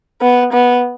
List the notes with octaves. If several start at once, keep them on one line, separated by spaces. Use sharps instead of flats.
B3
B3